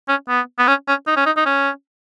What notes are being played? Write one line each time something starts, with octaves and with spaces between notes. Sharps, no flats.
C#4
B3
B3
C#4
C#4
D#4
C#4
D#4
D#4
C#4